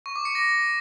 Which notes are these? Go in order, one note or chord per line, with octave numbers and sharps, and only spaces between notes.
C#6
D6
C#7
A#6